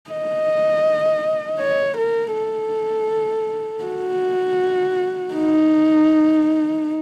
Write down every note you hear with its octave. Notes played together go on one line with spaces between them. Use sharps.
D#5
C#5
A#4
A4
F#4
D#4